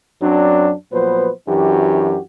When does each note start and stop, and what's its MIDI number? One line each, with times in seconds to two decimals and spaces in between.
0.22 0.72 42
0.22 0.72 54
0.22 0.72 60
0.22 0.72 62
0.92 1.30 46
0.92 1.30 53
0.92 1.30 54
0.92 1.30 59
0.92 1.30 71
0.92 1.30 72
1.48 2.19 42
1.48 2.19 52
1.48 2.19 62
1.48 2.19 66
1.48 2.19 67